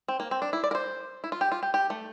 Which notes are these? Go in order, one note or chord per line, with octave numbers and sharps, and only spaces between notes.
C4
A#3
C4
D4
E4
D5
A#4
C5
E4
F4
G4
F4
G4
G4
A3